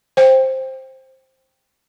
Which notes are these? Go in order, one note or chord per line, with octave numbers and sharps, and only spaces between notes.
C5 G5